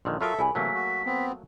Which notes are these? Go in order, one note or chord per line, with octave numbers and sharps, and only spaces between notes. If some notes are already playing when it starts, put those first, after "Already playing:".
A#1 D3 D#3 C6
F#3 F4 A4 A#4 E5 B5 C#6 D#6
C2 G#4 A#4 G#5 B5
C3 E3 F#3 A3 A#3 F#5 A5 B6
F#4
B3 C4